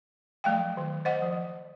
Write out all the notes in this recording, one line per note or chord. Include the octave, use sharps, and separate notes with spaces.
F3 F#3 A3 F5 G5
D#3
C5 D#5 F#5
F3